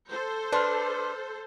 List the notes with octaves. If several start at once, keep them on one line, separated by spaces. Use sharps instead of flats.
A4 C5
D4 B4 C6 F6